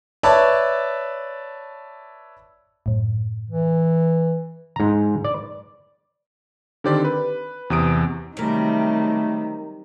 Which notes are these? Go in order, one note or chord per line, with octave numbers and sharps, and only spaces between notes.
B4 C#5 D5 E5 A5
F#2 A2
E3
G#2 A#5
D5
D3 D#3 C4 G4 C5 D5
B4
E2 C3 D#6 D7
C3 D#3 F#3 G3 A3 C4 A#4